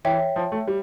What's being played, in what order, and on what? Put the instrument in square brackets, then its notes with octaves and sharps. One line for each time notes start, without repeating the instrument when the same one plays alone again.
[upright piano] E3 [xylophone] C#5 E5 G5
[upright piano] F3
A3
G3